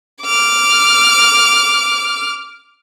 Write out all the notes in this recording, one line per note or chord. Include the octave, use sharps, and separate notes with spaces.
D6 F6